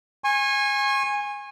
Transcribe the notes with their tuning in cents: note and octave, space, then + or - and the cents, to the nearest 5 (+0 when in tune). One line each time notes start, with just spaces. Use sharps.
G#5 -15 C#6 -40